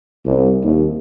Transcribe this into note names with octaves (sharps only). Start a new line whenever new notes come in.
C2
D#2